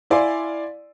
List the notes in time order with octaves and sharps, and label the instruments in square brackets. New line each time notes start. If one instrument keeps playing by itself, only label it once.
[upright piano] E4 D5 F5 G#5 C6